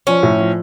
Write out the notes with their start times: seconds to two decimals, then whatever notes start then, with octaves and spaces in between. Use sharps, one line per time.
0.07 F3 C#4
0.23 A2
0.39 F3